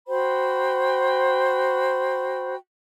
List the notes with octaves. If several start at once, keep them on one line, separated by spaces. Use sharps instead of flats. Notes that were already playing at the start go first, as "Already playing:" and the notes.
F#4 C5 G5 B5